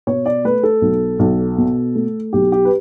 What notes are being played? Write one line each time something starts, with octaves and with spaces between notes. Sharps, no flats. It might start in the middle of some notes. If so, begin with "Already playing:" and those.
B2 C#5
D5
A3 B4
A4
B1
B1
B2
A3
B1 G4
G4
B4